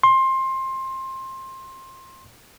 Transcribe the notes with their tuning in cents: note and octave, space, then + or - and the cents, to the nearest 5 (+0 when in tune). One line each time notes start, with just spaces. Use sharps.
C6 +20